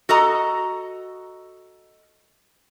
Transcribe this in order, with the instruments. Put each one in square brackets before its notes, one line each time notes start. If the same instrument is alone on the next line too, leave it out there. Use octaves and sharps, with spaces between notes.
[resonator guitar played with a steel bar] F#4 A4 D#5 A#5